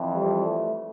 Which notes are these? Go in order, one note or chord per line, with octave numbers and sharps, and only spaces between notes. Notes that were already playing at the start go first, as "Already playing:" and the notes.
Already playing: F2 E3
G3
A3